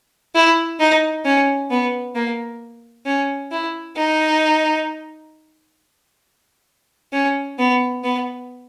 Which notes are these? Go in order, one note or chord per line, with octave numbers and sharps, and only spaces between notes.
E4
D#4
C#4
B3
A#3
C#4
E4
D#4
C#4
B3
B3